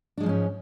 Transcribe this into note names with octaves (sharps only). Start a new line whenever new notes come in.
G#2 F3 G#3 C#4 D4